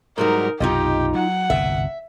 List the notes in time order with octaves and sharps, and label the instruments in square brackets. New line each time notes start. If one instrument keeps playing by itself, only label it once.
[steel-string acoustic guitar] G#2 F#3 G3 [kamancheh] D#4 A#4
[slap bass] B1 F#2 C3 [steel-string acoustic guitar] D#4 F4 D#5 [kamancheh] G4
[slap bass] F#3 [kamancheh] F#5
[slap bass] G1 C2 B2 [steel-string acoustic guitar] E5